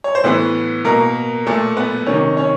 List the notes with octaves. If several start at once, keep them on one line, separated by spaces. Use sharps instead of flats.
C#5
C5
A2 E3 B3 B4
B2 A#3 A#4
A#2 A3 A4
B3 B4
C3 D#3 C#4 C#5
C#4 C#5